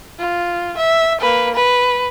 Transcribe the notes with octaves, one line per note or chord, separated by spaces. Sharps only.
F4
E5
A#3 B4
B4